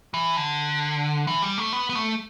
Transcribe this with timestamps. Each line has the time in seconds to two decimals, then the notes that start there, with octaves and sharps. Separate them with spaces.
0.14 E3
0.37 D3
1.27 E3
1.42 G3
1.58 A3
1.73 B3
1.90 B3
1.95 A3